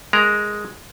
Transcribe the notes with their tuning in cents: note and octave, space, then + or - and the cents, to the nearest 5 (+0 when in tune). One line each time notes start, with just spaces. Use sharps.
G#3 +0 A#4 +0 A#5 +0